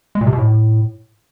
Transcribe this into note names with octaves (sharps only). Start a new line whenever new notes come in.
G#3
A#2
C3
B2
A2